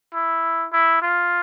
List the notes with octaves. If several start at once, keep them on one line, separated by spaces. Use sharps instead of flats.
E4
E4
F4